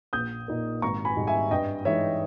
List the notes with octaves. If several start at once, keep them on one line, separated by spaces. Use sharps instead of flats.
A#1 D#6 G6
A#2 A#3 D#4
G#1 A#5 C#6
G#5 B5
G#2 G3
E5 G#5
G2 D#5 G5
E3 G#3 D#4 C#5 E5